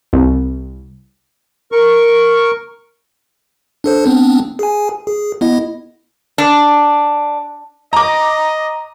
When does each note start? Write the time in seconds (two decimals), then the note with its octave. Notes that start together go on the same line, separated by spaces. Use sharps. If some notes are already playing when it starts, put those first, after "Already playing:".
0.13 C2
1.72 A#4 C#6
3.84 D4 A4 C5
4.04 B3 C4 D4
4.59 G#4 G#5
5.07 G#4
5.41 B3 E4 D#5
6.38 D4
7.93 D#5 A#5 D6